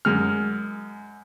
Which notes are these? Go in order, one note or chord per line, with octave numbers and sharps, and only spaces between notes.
F#2 G#3 F6